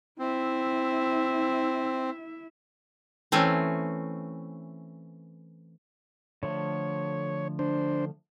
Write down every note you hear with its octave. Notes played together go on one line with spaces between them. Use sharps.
C4 E4 E5
E3 A3 C4 C#4
D3 F3 A3 C#5
D4 C5